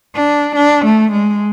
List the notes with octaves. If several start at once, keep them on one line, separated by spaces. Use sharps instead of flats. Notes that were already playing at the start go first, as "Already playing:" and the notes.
D4
D4
A3
G#3